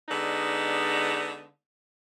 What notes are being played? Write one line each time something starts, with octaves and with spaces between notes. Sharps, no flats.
D3 G#3 B3 D#4 D5